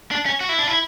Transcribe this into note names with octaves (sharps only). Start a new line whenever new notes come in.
D4
C#4
F#4
E4
D4
E4